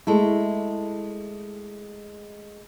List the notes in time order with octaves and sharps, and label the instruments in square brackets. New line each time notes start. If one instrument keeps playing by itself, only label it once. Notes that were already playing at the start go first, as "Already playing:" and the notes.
[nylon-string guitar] G#3 A3 E4